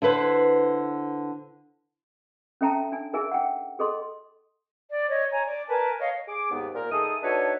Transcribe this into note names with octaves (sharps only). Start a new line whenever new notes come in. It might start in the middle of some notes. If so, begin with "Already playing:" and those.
D3 E4 B4 C5
C#4 A4 E5 G5 A5 A#5
D4 G#5
D#4 G#4 A#4 E5 G#5
F#5 G5
G#4 A4 D#5 C6
D5
C#5 D#5
C#5 G#5 A#5
D5
A#4 B4 G#5 A5
C#5 D#5 F5
G#4 D6
D#2 G#2 B3
A#2 A#4
D#3 A3 G#4 A4 D#6
D4 D#4 F#4 A4 B4 C#5